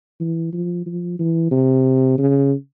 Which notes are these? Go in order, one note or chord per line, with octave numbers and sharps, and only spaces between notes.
E3
F3
F3
E3
C3
C#3